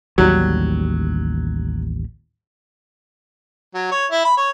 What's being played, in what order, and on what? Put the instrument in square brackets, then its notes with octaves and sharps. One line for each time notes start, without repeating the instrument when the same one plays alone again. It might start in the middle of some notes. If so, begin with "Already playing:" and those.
[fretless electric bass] A1 D#2 G3 [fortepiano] F#3
[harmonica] F#3
C#5
E4
B5
C#5